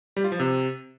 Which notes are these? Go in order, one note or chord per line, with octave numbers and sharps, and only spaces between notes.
G3
F4
F3
C3